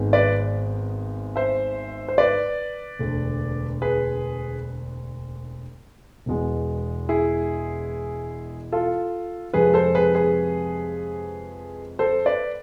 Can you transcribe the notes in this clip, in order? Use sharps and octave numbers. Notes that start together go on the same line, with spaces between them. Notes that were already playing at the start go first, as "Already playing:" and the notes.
Already playing: G#1 G#2 G#3 B3
B4 D5
C5 E5
C5
B4 D5
E1 D2 D3 A3
G#4 B4
E1 E2 B2 G#3 B3
E4 G#4
F4 A4
F2 C3 F3 G#3 G#4 B4
A4 C5
G#4 B4
G#4 B4
A4 C5
B4 D5